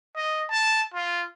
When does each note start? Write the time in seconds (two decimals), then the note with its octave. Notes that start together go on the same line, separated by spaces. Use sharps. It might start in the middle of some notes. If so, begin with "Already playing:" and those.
0.16 D#5
0.50 A5
0.94 F4